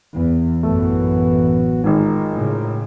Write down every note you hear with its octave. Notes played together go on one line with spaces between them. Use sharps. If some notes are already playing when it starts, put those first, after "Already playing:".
E2
A1 F#2 E3 A3 B3 F#4
G#1 G#2 G#3 F4 A#4
A2 C#3